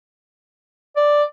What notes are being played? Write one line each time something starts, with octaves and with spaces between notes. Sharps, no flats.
D5